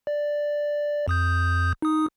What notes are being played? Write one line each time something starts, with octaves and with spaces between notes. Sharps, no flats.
D5
F2 D#6 G6
D#4 D#6